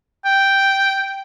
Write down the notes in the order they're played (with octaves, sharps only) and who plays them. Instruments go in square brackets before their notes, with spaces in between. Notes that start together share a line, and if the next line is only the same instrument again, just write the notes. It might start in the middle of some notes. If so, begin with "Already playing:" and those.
[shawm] G5